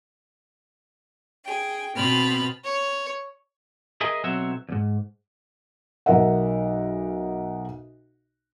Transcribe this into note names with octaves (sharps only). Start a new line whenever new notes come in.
G#4 G5
B2 B3 C4 B5 F6 A6
C#5
G#4 A#4 D#5 E5 G#5
B1 F#3 C4 F#4 C#5 E5
E2 G#2
B1 A#4 E5 F#5